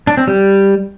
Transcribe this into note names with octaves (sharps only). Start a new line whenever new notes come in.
D4
C4
G3